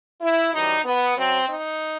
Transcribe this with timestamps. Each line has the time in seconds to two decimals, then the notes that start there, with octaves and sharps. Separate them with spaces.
0.22 E4
0.53 F#2 E3 G3 D#4
0.85 B3
1.17 F#2 F#3 C4
1.49 D#4